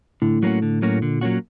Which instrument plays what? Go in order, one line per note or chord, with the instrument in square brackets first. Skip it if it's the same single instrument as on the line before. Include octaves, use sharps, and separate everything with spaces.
[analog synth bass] A2 [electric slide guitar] D3
[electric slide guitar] F#3 A#3 C#4 F#4
D3
F#3 A#3 C#4 F#4
[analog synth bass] A#2 [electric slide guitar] D3
[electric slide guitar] F#3 A#3 C#4 F#4